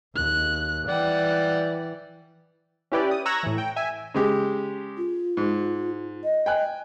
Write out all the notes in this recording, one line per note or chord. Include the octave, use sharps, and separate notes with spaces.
D#2 F#6
E3 D5 F#5 G5
C#4 E4 G4 B4 D5
D#6
A#5 C#6 E6 F#6 G#6 A#6
A2 E3
G5
E5 G#5
C#3 G#3 G4
F4
G#2
D#5
G5 G#5 F#6